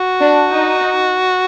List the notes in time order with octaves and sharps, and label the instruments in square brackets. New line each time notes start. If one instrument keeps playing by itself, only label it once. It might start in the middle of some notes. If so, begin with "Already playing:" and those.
Already playing: [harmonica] F#4
[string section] D4
D#4